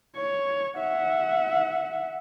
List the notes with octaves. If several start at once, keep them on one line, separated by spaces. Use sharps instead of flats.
C#5
E5 F#5